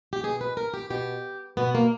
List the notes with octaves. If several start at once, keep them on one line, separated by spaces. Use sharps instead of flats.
G4
B2 G#4
B4
A#4
G4
B2 G4
B2 B3
A#3